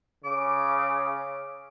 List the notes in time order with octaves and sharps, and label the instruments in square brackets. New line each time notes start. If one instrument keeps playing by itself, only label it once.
[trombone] C#3 [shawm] D6